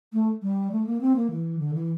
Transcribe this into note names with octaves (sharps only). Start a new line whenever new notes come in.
A3
G3
A3
A#3
C4
A#3
E3
D3
E3